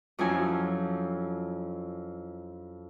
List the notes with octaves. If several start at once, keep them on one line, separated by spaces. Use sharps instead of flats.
F2 F3 F#3 C#4 E4 G#5